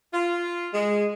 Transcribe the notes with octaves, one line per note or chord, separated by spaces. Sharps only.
F4
G#3